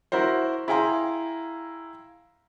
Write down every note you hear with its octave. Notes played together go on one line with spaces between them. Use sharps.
E4 F#4 A#4 C5
E4 G#4 F5 G5 A#5 C6